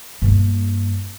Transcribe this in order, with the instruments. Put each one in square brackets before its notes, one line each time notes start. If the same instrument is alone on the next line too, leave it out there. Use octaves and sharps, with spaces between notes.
[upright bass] G2 A#3